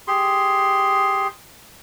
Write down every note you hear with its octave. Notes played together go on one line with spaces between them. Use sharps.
G4 G#4 C6